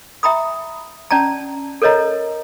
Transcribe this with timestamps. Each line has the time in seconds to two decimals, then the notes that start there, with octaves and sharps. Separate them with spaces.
0.23 E5 G5 A#5 B5 D#6
1.11 C#4 D5 A5 A#5
1.82 A4 A#4 C#5 D#5 A#5